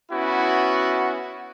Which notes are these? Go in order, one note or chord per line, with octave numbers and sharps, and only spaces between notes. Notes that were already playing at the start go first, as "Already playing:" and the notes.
B3 C#4 E4 F#4